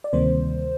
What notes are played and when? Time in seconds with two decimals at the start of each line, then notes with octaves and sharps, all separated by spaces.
0.04 D5
0.13 D2 C3 D#3 G3 A#3 C5